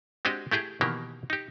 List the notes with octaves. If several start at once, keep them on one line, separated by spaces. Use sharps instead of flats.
G#3 C4 D4 F#4 G4 D#5
A3 E4 G4 G#4 G5
B2 D#3 E3 A#3 G4
D#4 G4